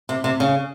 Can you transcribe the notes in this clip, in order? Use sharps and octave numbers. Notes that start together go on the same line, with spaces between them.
C3
C3
C#3